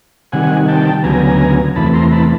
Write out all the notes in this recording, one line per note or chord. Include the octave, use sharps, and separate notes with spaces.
C3 D#3 G3 F#5 G#5
G5 A5
D2 C#3 F#3 B3 G#5 A#5
E2 C3 E3 A3 A5 B5
A#5 C6
A5 B5